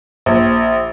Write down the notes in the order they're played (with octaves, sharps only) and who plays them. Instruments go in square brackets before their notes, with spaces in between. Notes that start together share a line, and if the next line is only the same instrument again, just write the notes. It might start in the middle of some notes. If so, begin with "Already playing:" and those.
[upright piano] A#1